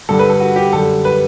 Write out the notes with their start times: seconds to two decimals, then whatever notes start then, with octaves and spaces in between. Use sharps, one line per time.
0.09 G2 D3 G3 A4
0.19 B4
0.30 A4
0.40 F#4
0.56 G4
0.73 F#2 D3 G3 A4
1.05 B4